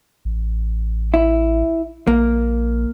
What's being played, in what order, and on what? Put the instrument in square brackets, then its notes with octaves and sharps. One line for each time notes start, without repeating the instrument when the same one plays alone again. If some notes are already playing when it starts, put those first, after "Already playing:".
[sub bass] A1
[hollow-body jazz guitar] E4
[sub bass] A#1 [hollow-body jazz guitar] A#3